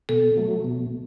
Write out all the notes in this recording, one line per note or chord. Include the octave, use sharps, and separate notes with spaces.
B2 A4
F#3 A3
B2